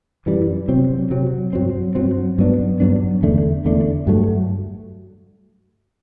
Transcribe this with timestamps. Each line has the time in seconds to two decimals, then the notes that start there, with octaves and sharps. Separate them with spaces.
0.26 F#2 E3 G3
0.68 C3 F#3 C4
1.10 C3 F#3 C4
1.53 G2 F#3 C4
1.95 G2 F#3 C4
2.38 G2 F#3 B3 D4
2.80 G2 F#3 B3 D4
3.23 E2 D3 A3 D4
3.65 E2 D3 A3 D4
4.07 G2 F#3 A3